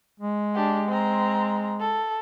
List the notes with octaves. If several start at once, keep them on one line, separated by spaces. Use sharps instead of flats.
G#3
D4 G4
C4 A#5
A4